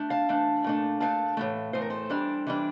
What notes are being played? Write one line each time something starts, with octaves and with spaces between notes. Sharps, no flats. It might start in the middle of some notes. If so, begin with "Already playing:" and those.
Already playing: A3 D4
F5 A5
E3 A3 D4
A#2 A3 D4
A#2 A3 D4 F5 A5
A2 E3 A3
A2 E3 A3 C5
A#4
A4 C5
E3 G3 D4
E3 G3 D4